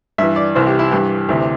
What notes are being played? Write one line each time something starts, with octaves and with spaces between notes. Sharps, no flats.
G2 E3 E5
D5
C2 C3 E3 C5
G4
E4
G2 E3 G4
D2 C3 E3